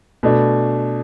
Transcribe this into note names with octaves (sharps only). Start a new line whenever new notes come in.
B2 A3 D4